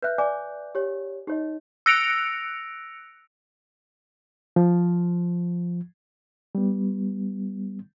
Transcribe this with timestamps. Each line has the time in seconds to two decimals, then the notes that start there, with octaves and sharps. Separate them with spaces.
0.02 B4 E5 F#6 G6
0.18 D5 G#5 D6
0.75 G4 C#5
1.27 D#4 G4 C#5 D#5
1.86 E6 F#6 A#6 C#7 D7 F7
4.56 F3
6.55 G3 B3